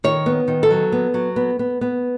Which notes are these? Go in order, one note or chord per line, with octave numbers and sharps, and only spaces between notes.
D#3 C#5
B3
D#3
A4
F#3
B3
F#3
B3
B3
B3